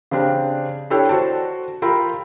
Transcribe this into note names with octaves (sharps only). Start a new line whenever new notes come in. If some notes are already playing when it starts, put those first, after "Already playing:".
C#3 C4 D4 G4
D4 E4 G4 A4 C#5 G5
F#4 C5 A5
F4 G4 A#4 G5 B5 E6